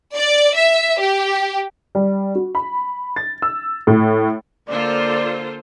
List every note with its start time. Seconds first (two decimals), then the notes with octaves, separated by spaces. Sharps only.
0.15 D5
0.56 E5
0.99 G4
1.95 G3
2.35 F#4
2.55 B5
3.16 A6
3.42 E6
3.87 A2
4.69 D3 A#3 F4 A4 C5 D5